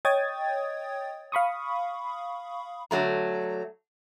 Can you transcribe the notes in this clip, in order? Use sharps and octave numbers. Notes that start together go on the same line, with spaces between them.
C#5 D#5 G5 D#6 G#6 A6
F5 B5 C#6 D#6
D3 F#3 A3 A#5